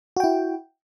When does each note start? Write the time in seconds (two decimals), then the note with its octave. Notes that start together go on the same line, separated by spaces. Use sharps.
0.17 F#4
0.20 G5
0.24 E4